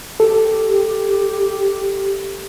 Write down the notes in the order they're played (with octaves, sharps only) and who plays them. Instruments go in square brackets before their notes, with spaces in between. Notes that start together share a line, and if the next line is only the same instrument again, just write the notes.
[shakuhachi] G4 [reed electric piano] A4